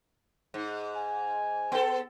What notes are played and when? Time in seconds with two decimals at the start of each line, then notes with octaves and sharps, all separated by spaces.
0.54 G#2
0.96 G#5
1.72 B3 A4